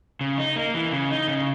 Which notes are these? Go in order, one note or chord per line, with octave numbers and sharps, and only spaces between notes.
C#3
D#4
A#3
E3
C#3
D#4
C#3